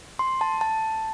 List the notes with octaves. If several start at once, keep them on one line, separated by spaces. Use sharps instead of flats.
C6
A5
A5